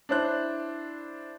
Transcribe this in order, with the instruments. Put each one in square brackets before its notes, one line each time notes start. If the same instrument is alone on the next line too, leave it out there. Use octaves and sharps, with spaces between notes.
[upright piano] D4 E4 C5 F#6